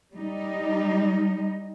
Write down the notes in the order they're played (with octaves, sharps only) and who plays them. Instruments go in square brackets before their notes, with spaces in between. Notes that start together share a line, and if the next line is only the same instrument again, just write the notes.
[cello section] G3 D#4